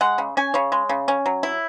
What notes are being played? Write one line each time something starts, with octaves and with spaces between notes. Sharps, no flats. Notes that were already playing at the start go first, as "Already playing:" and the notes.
G#3 F#5
C#3
C#4 G#5
C#3 C#5
G#3
C#3
C#4
F#3
E4